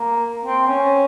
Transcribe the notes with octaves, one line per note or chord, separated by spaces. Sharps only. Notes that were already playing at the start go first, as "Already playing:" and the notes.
Already playing: A#3
C4
C#4